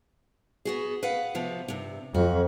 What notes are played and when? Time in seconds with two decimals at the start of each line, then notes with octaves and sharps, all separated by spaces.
0.65 B3 F#4 G#4
1.03 B4 F5 F#5
1.35 C3 F3 B3
1.68 G2 C3
2.14 F2 F#4